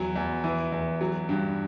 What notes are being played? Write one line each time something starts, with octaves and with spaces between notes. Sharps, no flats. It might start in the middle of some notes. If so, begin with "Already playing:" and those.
Already playing: E2 F#3
E2
E3
E2
F#3
G2